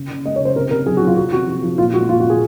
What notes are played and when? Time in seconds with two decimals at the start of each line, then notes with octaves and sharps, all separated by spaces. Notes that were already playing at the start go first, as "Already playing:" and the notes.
Already playing: C#3
0.10 C#3
0.26 G#3 D#5
0.36 C#5
0.40 C#3
0.45 C5
0.56 C3 A#4
0.71 C3 A#4
0.86 F#3 G#4
0.97 F#4
1.02 F#3 F4
1.16 C3 F#4
1.33 C3 F#4
1.47 F3
1.63 F3
1.78 A#2 F4
1.94 G#3 F#4
2.09 A#2 F4
2.20 F#4
2.25 A#2
2.30 G#4